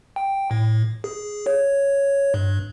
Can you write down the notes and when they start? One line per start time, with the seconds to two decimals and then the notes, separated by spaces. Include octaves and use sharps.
0.16 G5
0.51 A2
1.04 G#4
1.46 C#5
2.34 G2